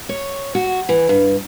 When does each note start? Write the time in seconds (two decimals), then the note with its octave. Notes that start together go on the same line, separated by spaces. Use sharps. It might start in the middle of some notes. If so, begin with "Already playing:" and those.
0.09 C#5
0.55 F#4
0.89 E3
1.09 G2